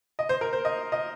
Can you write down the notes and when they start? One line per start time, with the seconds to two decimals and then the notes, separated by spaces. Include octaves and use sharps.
0.19 D#5
0.29 C5
0.41 A#4
0.53 C5
0.65 D#5
0.92 D#5